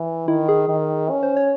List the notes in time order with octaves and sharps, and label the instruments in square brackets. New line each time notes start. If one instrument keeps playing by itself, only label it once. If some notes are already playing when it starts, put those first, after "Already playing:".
Already playing: [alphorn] E3
[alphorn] D#3 [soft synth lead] E4
[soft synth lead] G#4
[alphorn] D#3
C#4
[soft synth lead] C5
C#5